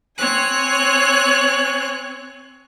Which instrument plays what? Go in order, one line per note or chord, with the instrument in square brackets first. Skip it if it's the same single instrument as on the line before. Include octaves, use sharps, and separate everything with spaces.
[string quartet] C4 C#5 G#5 F#6